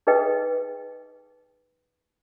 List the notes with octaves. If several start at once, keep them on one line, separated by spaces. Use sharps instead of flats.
D#4 G#4 A4 B4 D#5 G5